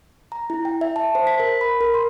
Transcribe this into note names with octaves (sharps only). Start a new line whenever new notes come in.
A#5
E4
G5
E5
A5
C5
B6
A#4
B5
A#4
C6